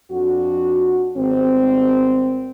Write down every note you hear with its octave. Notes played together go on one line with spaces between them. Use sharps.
F2 D4 F#4
G#1 G3 B3 C4